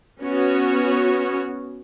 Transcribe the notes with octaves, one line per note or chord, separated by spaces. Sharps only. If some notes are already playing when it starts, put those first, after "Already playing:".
B3 C#4 F#4 C#5